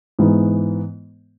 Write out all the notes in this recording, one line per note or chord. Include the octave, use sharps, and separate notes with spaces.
G#2 E3 G#3 B3